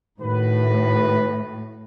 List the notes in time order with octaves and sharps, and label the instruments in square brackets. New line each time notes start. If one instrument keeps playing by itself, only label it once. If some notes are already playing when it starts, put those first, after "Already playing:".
[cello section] A2 [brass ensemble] D#3 F#4 B4